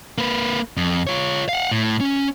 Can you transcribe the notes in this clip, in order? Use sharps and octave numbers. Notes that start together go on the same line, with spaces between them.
A#3 B4
F2
F4 C#5
F5 F#5
A2
C#4